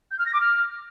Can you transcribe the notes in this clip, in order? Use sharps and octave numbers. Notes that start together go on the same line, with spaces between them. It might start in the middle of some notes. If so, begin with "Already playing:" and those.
G6
F6
A#6
D6
F6